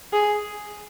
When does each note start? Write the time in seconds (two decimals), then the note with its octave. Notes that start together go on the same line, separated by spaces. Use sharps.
0.13 G#4